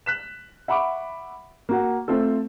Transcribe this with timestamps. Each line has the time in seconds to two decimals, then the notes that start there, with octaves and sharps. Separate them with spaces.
0.06 F#6 B6 E7
0.68 E5 F#5 B5 C#6 D6
1.69 A#3 F#4 F#5
2.08 A3 C4 F4 A4